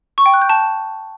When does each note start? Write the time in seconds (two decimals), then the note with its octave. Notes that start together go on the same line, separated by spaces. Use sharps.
0.18 C#6
0.26 G5
0.34 F#6
0.42 G6
0.49 A5